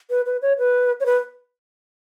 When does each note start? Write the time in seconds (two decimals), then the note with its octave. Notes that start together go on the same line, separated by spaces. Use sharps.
0.10 B4
0.26 B4
0.42 C#5
0.59 B4
1.00 C#5
1.06 B4